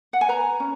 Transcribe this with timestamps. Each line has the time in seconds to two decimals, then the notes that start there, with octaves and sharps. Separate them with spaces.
0.13 F#5
0.21 G#5
0.28 B4 A#5
0.60 C#4